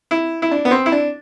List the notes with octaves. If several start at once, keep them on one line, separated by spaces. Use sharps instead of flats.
E4
E4
D4
B3
C4
E4
D4